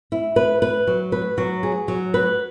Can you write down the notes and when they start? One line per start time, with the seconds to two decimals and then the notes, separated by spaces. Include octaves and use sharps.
0.12 E4
0.36 B4
0.62 B4
0.87 F#3
1.12 B4
1.38 F#3
1.63 G#4
1.88 F#3
2.14 B4